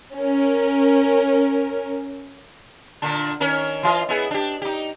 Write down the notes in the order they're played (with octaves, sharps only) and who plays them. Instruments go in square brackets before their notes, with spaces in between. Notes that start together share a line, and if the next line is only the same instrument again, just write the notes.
[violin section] C#4 A#4
[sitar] A#2 D3 D4
D#3 C#4 A#4
E3 F4 D#5
B3 E4 G#4
D4 G4
D#4 G4